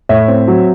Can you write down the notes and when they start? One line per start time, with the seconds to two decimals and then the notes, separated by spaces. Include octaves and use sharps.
0.09 A2 C#5 E5
0.28 C4
0.48 F#3